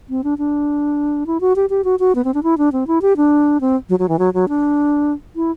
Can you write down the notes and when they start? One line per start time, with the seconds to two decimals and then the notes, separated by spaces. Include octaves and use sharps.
0.10 C4
0.24 D4
0.38 D4
1.27 E4
1.41 F#4
1.56 G4
1.70 G4
1.84 F#4
1.99 F#4
2.15 B3
2.24 C4
2.34 D4
2.43 E4
2.58 D4
2.72 C4
2.87 E4
3.02 G4
3.17 D4
3.61 C4
3.89 F#3
3.99 F#3
4.09 E3
4.19 F#3
4.34 F#3
4.48 D4
5.36 E4